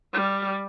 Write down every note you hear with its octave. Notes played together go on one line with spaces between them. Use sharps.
G3